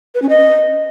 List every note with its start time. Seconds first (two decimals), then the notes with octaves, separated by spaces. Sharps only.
0.15 B4
0.22 C#4
0.29 D#5